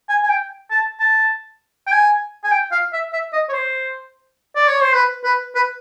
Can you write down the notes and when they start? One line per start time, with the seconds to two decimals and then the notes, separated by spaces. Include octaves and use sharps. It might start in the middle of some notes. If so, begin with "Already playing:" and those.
0.09 G#5
0.23 G#5
0.30 G5
0.71 A5
1.00 A5
1.87 G5
1.92 G#5
2.44 G#5
2.52 G5
2.72 F5
2.93 E5
3.13 E5
3.33 D#5
3.49 C#5
3.53 C5
4.56 D5
4.68 C#5
4.81 C5
4.94 B4
5.24 B4
5.55 B4